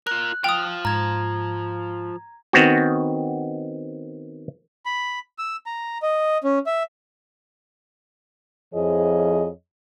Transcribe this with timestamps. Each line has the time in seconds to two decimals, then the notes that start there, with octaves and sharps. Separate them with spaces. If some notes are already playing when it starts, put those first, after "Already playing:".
0.07 F4 A#4 F#6
0.44 F3 F5 G5 D#6
0.85 G#2 A#5 G#6
2.53 D#3 B3 C4 F#4
4.86 B5
5.38 E6
5.66 A#5
6.02 D#5
6.44 C#4
6.66 E5
8.74 F2 F3 E4 G#4 C#5 D#5